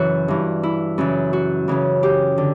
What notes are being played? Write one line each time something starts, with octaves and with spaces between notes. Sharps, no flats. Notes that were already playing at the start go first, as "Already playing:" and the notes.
Already playing: F#2 C#3 E3 E4 F#4
G2 E3
E4
F#2 C#3 E3
F#4
F#2 C#3 E3
G4
D3